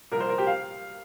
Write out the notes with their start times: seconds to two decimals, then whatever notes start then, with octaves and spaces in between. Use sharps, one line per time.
0.12 C2 A#2 F3 A#4
0.20 C5
0.29 A#4
0.38 G4
0.47 F5